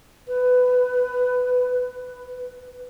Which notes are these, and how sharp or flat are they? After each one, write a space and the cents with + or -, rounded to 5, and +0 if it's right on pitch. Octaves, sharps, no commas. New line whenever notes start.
B4 +15
B4 +10